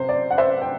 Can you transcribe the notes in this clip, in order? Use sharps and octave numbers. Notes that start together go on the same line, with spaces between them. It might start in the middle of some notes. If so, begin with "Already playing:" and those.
Already playing: C3 C5
D5
F#5
C5 E5
G5